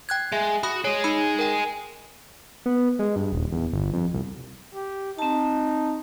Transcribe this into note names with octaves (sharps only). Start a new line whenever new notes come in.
G5 F#6 G#6
G#3 E5
F#4 B5 D#6
G#4 C#5 D#5
D#4 B5
A#4 G5
B3
G#3
G2
D#1
E2
G1
F2
C2
G4
C4 D#4 A5